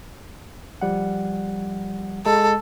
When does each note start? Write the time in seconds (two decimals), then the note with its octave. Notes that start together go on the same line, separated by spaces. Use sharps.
0.81 F3 G3 F#5
2.26 G#3 A4